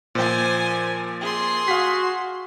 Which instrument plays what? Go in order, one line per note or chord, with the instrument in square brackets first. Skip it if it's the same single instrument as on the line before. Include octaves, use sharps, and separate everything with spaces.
[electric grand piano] A#2 F3 [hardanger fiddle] C5 G#5
[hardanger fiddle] G#4 C6
[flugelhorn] F#4 [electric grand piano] F5 B6